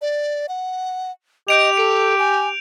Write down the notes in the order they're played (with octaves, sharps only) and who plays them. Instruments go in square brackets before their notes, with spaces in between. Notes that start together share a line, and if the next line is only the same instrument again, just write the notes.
[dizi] D5
F#5
[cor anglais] G4 [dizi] D#5 [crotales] G6 D7 F7
[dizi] A4 [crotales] D7
[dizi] G#5